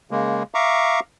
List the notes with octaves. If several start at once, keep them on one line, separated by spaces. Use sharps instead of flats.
C#3 G#3 A#3
E5 F5 A#5 C#6 D6